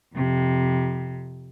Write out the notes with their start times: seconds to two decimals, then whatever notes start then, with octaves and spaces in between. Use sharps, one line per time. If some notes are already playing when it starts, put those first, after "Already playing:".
0.15 F2 C3